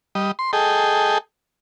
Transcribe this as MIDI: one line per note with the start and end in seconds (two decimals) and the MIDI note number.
0.15 0.32 55
0.15 0.32 75
0.39 0.51 84
0.53 1.18 68
0.53 1.18 69
0.53 1.18 75
0.53 1.18 79